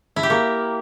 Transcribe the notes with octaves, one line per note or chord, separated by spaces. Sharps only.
E4
G4
A#3